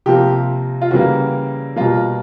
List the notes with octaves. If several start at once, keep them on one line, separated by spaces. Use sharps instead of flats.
C3 F3 A#3 G4
F4
C#3 E3 G3 A#3 F#4
B2 G3 A#3 F4